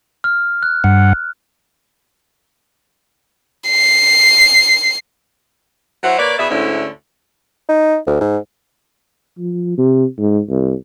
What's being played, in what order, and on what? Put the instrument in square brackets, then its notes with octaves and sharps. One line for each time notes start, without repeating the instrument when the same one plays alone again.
[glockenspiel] F6
F#6
[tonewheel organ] G2 F#5
[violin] C7
[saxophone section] F#3 E4 F#4 C5 F#5
A#3 B4 C#5 D5
B2 E4 G#4 D5 E5
D2 G#2 D3 A3 C#4 E4
[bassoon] D#4
D2
G#2
[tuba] F3
C3
G#2
C2